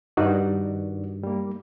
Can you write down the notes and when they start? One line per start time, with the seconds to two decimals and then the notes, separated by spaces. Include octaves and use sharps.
0.17 G2 D#3 D#4 F#4 D5
1.23 G3 A#3